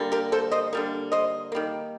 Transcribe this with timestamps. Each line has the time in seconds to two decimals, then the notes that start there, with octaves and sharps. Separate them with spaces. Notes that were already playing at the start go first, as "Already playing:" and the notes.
Already playing: D3 G3 A#3
0.12 G4 A#4
0.32 A4 C5
0.51 C5 D#5
0.73 D3 G3 A#3
1.12 C5 D#5
1.52 D#3 G3 A#3